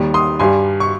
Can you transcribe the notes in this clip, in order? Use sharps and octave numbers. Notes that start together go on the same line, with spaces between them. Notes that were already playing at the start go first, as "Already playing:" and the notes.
Already playing: D#2 D#3 G3
C6 D#6
G2 G3 G#5 C6
C#6